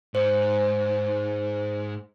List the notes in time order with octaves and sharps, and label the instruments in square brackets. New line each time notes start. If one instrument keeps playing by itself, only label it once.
[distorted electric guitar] G#2 [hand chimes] C5